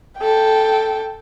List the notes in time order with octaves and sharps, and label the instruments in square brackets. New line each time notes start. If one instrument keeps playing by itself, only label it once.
[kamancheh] A4 G5